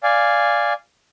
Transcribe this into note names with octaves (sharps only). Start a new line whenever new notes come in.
D5 F5 G#5